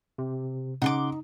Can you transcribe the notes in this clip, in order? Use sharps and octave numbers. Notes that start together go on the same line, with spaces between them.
C3
C#3 D#4 F#5 C6 D6